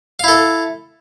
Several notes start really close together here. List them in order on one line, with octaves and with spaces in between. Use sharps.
F5 E4 A4